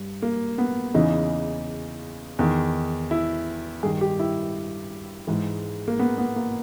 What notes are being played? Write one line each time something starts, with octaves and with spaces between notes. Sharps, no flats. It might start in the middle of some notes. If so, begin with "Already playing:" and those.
Already playing: G2
A#3
B3
E2 C#3 E3 D#4
E2 D#3
E4
G2 D#3 G#4
G4
E4
G#2 E3
A#3
B3
B3
A#3